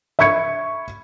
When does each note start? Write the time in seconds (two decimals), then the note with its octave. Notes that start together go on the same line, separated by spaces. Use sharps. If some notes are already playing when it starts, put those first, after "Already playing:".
0.19 E5 B5 C#6 G#6 C#7